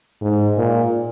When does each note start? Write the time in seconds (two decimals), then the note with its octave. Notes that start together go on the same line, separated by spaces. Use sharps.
0.21 G#2
0.57 A#2